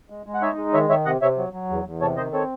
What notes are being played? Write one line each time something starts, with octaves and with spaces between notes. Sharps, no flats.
G#3
G#3
F#5
D#4 C#5 E5
G#3
D#3 C#5 E5
D#3 C#5 E5
C3 D#5 F#5
C3 C#5 E5
F#3
F#3
E2
E2
C3 A4 C#5
D#3 C5 D#5
C4 A4 C#5